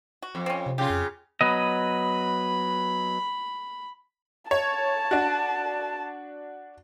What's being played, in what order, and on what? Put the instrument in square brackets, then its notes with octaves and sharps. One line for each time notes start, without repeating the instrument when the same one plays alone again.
[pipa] F#4
[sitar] F2
[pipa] C4 C#4
[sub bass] C3
[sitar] C#3 F4 [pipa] G4
[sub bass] F2
[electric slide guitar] F#3 B3 D#5 [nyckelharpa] B5
[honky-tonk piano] C#5 [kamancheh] A5
[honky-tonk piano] D4 F#4